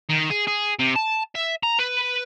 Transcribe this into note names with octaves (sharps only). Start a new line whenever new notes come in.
D#3
G#4
G#4
C3
A5
E5
A#5
B4